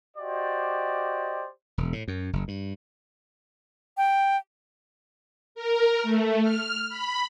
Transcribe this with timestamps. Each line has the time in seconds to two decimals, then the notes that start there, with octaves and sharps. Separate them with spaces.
0.17 F#4 G4 C5 D5 D#5
1.78 E1
1.93 A2
2.08 F#2
2.33 F#1
2.48 G2
3.97 G5
5.55 A#4
6.03 A3
6.42 F6
6.89 B5